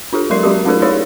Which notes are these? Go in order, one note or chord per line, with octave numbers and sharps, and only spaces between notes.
D4 F4 G4 A4
F#3 G#3 A#4 C6 C7
F#3 G#3 C#4 F#4 G4
A3 C#4 D#4 F4 G#4 A#4
D#4 E4 G4 G#4 C#5 D5